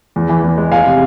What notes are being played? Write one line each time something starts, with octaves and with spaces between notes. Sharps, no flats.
E2
E3
E2
G#3
E2 F5 G#5
C3